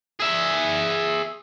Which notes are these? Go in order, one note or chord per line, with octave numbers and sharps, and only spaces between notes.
G#4 E5